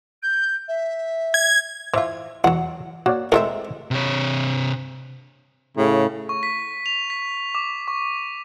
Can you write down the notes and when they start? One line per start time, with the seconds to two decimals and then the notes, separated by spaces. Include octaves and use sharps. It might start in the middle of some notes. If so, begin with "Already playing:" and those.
0.22 G6
0.68 E5
1.34 G#6
1.94 E3 F4 C5 E5
2.44 E2 F#3 F#5
3.06 A#3 F#4 C#5 D5
3.32 A2 G#3 C4 A4 A#4 E5
3.91 C3 C#5
5.77 A2 C#3
6.29 C#6
6.43 B6
6.86 F7
7.10 B6
7.55 D6
7.88 C#6